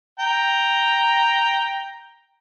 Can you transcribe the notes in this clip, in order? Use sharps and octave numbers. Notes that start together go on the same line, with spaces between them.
G5 A#5